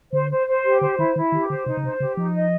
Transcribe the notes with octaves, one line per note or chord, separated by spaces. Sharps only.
D3 C5
C5
C5
G4
D3 C5
D#3 E4
D#3 E4
D#3 G4
D3 C5
C3 D#4
C#3
C3 C5
C#3 G4
F3 D#4
D#5